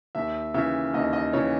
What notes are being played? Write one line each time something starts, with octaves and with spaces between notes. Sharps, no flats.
D#2 E5
C#3 E3 E5
D#2 D#5
D#5
C#3 E3 C#5